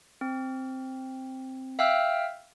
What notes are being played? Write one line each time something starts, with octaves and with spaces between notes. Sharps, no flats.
C4
E5 F5 G5 E6 F6